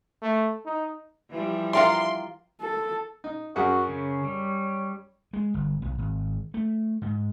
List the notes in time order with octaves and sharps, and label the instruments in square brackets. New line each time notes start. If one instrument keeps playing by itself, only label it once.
[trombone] A3
D#4
[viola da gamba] E3 F3 G3
[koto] F4 A#4 D5 [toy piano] E5 F#5 G5 [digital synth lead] C6
[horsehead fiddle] A4
[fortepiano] D#4
[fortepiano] F#2 G#4 F#5 [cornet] F#4
[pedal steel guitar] C#3 [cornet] C#5
[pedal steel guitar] G3
[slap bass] G#3
G1
B1
G#1
A3
G#2